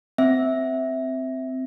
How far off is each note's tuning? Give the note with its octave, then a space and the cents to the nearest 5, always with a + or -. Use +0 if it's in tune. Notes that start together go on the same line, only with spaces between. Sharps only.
C4 -10 E5 -10